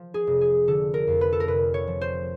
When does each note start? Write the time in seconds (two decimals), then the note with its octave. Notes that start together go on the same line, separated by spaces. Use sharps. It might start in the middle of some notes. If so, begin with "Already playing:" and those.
Already playing: F3
0.14 G#4
0.27 F1
0.41 G#4
0.67 D3 A4
0.94 A#4
1.07 F2
1.21 B4
1.33 A4
1.40 A#4
1.48 F1 B4
1.74 C#5
1.87 F3
2.01 C5